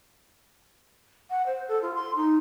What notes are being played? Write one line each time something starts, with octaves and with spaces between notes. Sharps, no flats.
F#5
C5
A4
F4
C6
D#4